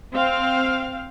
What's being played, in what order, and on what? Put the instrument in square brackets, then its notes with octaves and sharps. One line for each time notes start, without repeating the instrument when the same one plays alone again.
[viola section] C4 F5